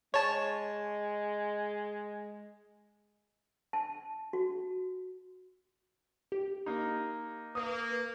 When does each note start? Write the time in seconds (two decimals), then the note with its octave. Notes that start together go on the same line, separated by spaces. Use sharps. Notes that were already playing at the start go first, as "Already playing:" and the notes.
0.14 G#3 C#5 A5
3.73 A5
4.33 F#4
6.32 G4
6.66 A#3 D#4
7.55 A#3 B4 D#6